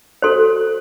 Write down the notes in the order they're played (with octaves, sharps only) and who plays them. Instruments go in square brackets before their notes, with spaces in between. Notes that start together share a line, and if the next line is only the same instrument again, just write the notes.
[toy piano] F#4 A4 C5 C6